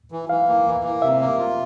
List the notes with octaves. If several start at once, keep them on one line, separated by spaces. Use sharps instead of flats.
E3
E3 F5
A#3
E3
A#3
C3 E5
A#3
F4